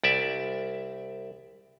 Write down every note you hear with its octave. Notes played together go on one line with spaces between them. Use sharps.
C2 D5 E5